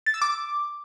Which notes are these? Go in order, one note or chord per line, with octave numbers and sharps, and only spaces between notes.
A6
E6
D6